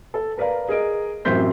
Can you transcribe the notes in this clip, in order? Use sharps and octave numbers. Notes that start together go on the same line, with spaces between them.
A4
A#4 B4 D5 F5 A#5
G#4 A#4 D#5 D7
A1 F#2 C4 C6 G6 B6